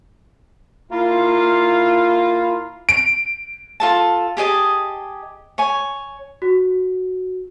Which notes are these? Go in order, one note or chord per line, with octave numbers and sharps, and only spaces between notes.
A#3 E4 F4
D7
F4 A4 A5
G4 G#4 D#5 A5
C#5 G#5
F#4